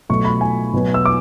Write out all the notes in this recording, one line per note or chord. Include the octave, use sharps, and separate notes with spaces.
B2 F#3 A3 C#6
B5
G#5
B2 F#3 B3
E6
D6